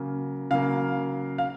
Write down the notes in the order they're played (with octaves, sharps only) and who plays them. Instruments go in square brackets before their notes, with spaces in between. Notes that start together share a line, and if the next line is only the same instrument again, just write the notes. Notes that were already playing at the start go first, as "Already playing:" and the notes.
Already playing: [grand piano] C#3 F#3 A#3
C#3 F#3 A#3 F5
F5